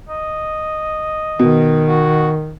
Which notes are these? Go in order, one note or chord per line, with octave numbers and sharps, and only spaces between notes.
D#5
B2 D#3
F#4